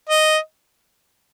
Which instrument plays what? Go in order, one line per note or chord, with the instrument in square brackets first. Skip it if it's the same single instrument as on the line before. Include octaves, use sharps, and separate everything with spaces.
[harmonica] D#5